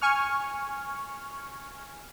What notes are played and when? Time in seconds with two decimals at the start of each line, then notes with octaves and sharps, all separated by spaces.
0.02 G#5 C#6 F6